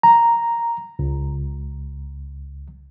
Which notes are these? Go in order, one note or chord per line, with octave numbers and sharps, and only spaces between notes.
A#5
C#2